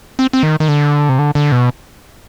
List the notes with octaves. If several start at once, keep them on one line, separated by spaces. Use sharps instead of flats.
C4
C4
D#3
D#3
D3
C3
D3
D3
B2